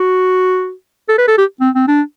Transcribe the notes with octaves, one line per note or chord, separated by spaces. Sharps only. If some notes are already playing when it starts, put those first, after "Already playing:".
Already playing: F#4
A4
B4
A4
G4
C4
C4
D4